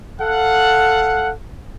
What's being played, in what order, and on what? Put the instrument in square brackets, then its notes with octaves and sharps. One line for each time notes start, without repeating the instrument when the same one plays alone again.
[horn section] A4 F5 F#5